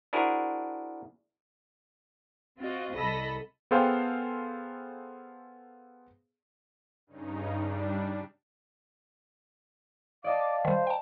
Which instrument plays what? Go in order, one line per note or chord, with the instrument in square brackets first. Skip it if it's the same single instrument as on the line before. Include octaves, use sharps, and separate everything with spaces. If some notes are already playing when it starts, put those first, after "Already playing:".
[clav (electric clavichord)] D4 E4 F#4 G#4 A#4 C5
[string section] C4 F4 F#4 D#5
C2 A4 D#5 B5 E6 A#6
[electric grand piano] B3 G#4 A4 C5 F5 G5
[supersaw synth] G2 C#3 D#4
G3 D4
[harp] D5 D#5 A5 [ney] F5 [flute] D6
[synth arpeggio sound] D#3 G3 [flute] C5
[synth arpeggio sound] G5 A5